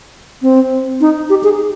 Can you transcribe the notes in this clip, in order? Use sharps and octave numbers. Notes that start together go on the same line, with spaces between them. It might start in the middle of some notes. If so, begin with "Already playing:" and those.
C4
D#4
G4
G#4